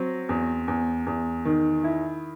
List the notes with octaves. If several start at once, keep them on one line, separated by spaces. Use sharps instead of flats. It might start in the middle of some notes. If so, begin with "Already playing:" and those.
Already playing: F#3 C4
E2
E2
E2
D#3
E4